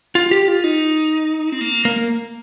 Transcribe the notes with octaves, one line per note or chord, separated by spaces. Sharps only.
F4
G4
F4
D#4
C4
A#3
A#3